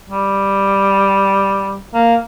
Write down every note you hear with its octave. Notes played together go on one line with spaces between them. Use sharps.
G3
A#3